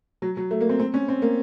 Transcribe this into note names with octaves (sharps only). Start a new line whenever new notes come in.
F#3
F#3
A3
A#3
C4
C4
C#4
C4
A#3